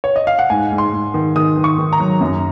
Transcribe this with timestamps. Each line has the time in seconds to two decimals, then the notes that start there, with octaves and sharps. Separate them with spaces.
0.04 C#5
0.16 D#5
0.27 F5
0.39 F#5
0.50 G#2 G#5
0.72 G#2
0.78 C6
0.93 G#2
1.14 D#3
1.36 D#3 D#6
1.57 D#3
1.64 C#6
1.78 D#3
1.93 A#5
2.00 F#3
2.21 F#2